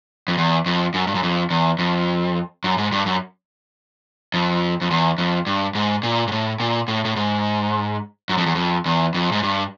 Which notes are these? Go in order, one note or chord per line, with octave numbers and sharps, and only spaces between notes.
F2
E2
F2
F#2
G2
F#2
F2
E2
F2
F#2
G#2
G2
F#2
F2
F2
E2
F2
G2
G#2
A#2
G#2
A2
A#2
A2
A2
G#2
F#2
F2
E2
F2
E2
F2
G#2
G2